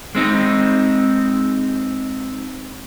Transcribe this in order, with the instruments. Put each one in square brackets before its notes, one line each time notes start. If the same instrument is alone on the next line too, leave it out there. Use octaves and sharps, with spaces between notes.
[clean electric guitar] G#3 C4 D#4